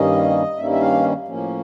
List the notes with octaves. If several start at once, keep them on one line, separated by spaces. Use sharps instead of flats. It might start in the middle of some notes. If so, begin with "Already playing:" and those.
Already playing: G2 D#3 G3 A#3 C#4 D#5
G2 D#3 G3 A#3 C#4 E5
E5
F5
A2 F3 A#3 C#4